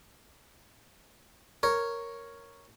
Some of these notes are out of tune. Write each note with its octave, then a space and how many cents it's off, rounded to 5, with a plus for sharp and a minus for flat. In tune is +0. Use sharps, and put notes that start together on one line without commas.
A#4 +0 C#5 +0